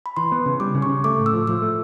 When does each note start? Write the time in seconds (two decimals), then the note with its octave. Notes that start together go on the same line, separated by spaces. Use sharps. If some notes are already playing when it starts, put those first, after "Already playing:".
0.06 B5
0.17 E3 C6
0.32 B3
0.46 C#3
0.60 G3 D6
0.75 C#3
0.82 C#6
0.89 C#3
1.04 A3 D6
1.19 A2
1.26 E6
1.33 F3
1.47 F3 E6
1.62 A3